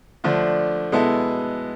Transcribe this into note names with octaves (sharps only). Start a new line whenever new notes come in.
D3 F3 A3 D4
B2 G#3 B3 E4 A4